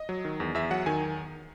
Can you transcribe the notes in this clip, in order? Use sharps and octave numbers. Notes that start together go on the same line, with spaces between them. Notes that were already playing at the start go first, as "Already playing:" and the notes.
Already playing: D#5
F#3
D#3
E2
E2 E5
F#3 F#5
D#3 G#5